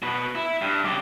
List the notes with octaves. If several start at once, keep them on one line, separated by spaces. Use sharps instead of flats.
B2 B4
E4
G2
C#3 G4